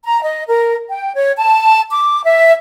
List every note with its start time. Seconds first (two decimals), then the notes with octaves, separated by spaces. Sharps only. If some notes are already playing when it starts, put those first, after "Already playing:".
0.04 A#5
0.22 D#5
0.48 A#4
0.88 G5
1.15 C#5
1.37 A5
1.90 D6
2.24 E5